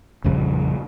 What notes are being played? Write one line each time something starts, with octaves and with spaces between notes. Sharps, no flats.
A#1 F2 C#3 G3